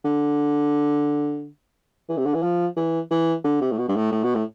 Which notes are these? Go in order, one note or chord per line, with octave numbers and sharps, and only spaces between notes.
D3
E3
C3
D3
E3
F3
E3
E3
D3
C3
A2
B2
G2
A2
A2
B2
A2